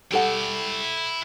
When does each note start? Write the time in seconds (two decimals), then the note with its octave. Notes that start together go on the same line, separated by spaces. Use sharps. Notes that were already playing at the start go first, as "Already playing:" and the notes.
0.12 G3 E4 A4 F#5 G5